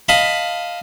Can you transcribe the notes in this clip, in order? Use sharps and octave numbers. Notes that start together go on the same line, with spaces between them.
D#5 F5 A5 B5